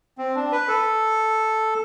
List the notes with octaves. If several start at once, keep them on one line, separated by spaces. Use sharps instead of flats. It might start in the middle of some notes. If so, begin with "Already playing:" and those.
C4
D4
B4
A4